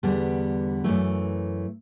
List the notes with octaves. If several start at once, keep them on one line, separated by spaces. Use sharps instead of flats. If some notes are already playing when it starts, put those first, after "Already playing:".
E2 D3 G3 B3
F#2 E3 A3